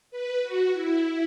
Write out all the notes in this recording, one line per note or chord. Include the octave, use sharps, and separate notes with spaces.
B4
F#4
E4